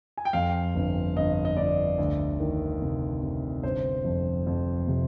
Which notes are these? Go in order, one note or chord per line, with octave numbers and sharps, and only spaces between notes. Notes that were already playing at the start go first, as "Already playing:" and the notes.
G#5
G5
F2 F5
G1
G1 D#5
D#5
G1 D5
D2
D#3
C3
C3
G1 C5
F2
F2
C3